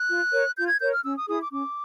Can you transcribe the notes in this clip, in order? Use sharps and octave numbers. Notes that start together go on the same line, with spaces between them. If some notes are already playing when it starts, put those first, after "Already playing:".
Already playing: F#6
F4
A#4 C#5
F4 G6
G#6
A#4 C#5 G6
F6
C#4 E6
D#6
E4 G#4 D#6
D6
C#4 D6